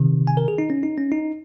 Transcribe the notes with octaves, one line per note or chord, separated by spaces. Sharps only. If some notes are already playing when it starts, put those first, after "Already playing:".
Already playing: C3 D#3
G#5
A#4
G#4
D#4
C#4
D#4
C#4
D#4